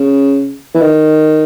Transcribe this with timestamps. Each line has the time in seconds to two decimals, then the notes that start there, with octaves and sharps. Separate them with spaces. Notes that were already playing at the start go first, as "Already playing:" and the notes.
Already playing: C#3
0.74 E3
0.81 D#3